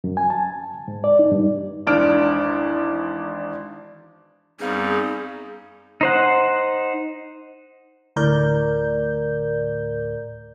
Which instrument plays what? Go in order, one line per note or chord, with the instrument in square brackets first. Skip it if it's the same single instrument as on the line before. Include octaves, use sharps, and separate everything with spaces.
[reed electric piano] F#2
G#5
A5
G#2
D5
D#4
G2
[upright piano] G#1 E2 D4 F6 D7
[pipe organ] F#2 G3 D#4 [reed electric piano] B3 C4 F5 [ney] G#4
[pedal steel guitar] D#4 C5 F#5
[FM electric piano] D2 A2 A#4 D5 G6